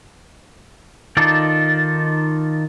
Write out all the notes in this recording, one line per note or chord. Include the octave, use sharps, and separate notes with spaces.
D#3 D#4 F4 A4 D5